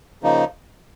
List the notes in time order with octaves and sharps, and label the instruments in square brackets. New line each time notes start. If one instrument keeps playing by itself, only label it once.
[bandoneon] C#3 F3 A#3 D#4